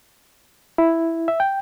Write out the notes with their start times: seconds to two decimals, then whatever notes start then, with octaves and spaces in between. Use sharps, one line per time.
0.78 E4
1.28 E5
1.40 G5